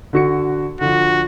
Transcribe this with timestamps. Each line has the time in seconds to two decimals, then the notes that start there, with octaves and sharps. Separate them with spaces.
0.13 D3 F#4 C#7
0.81 D3 F3 F#4